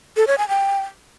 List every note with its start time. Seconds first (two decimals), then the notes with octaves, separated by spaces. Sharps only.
0.17 A4
0.27 C#5
0.38 G#5
0.49 G5